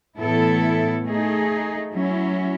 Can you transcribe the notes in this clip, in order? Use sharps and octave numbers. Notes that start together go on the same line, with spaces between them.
A2 E3 B3 E4 A4
A3 D#4 G#4
F#3 C#4 E4